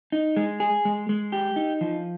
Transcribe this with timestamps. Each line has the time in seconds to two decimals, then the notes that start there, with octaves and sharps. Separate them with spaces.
0.12 D#4
0.37 G#3
0.60 G#4
0.85 G#3
1.09 G#3
1.32 G4
1.56 D#4
1.81 F3